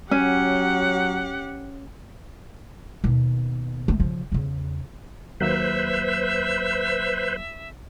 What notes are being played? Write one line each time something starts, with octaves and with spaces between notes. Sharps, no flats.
F#3 C#4 G4 F#5
D#2 B2
A3 C4
C#3 F3
E2 C#3
D#2 F#3 A#3 B4 C5 E5